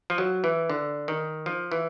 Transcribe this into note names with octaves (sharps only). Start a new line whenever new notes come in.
F3
F#3
E3
D3
D#3
F3
E3